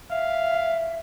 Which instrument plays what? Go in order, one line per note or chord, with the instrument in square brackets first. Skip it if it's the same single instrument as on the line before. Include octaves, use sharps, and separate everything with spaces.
[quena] E5 [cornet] F5